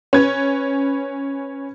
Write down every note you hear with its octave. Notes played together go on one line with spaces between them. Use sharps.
C#4 B4 G#6